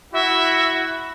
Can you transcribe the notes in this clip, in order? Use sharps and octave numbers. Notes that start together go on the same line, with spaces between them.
E4 F#4 E5